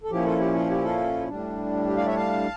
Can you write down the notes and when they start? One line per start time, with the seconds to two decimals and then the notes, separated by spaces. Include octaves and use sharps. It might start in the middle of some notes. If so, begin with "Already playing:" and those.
0.04 A4
0.11 A#2 F3 C#4 E4 G4
0.25 F4 A4
0.39 G4
0.55 F4
0.70 G4
0.84 F4 A4
1.28 A2 G3 D4
1.87 G4
1.97 D5 F5
2.06 C#5 E5
2.16 F5 A5